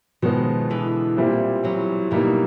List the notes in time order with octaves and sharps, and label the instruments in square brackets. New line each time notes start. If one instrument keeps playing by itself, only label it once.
[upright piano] B2 G#3 B3 [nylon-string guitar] D#3 F3
[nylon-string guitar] D3 E3
[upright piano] A#2 G3 C4 E4
[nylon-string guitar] E3 F#3
[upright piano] B2 G3 A#3 D#4 [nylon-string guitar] E3 F#3